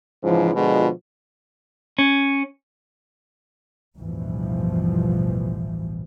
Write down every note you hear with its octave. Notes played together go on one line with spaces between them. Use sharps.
G#2 C#3 E3 F3
B2 D3 F3 G#3 F4
C#4
A1 D2 G2 B2 E3 F3